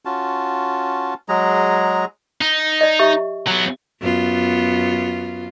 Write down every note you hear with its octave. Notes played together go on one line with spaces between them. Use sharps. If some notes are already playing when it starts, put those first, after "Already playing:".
C#4 F4 F#4 A5
F#3 G#3 G#4 A#5
D#4
D5 D#5
G4 E5 C#6
F#3 B3
F#2 B3 F4